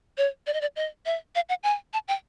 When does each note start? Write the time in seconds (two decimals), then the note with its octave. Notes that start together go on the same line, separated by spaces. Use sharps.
0.18 C#5
0.47 D5
0.54 D#5
0.61 D5
0.76 D#5
1.06 E5
1.35 F5
1.49 F#5
1.63 G#5
1.93 A5
2.08 G5